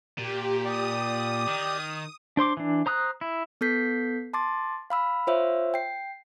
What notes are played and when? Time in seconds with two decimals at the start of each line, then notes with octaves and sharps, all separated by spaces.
0.18 A#2 G4
0.65 G4 D5 D#6
1.49 D#3
2.37 D4 C5 C6 D6
2.57 E3 D4
2.86 C5 A#5 D#6 F6 F#6
3.21 E4
3.61 B3 A4 G6 B6 C7
4.34 A5 C6 D6 A6
4.90 F5 B5 E6
5.27 F4 C5 C#5 E5 F5 E6
5.74 G5 C7